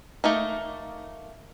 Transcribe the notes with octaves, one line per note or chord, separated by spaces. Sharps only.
A3 A#3 D#4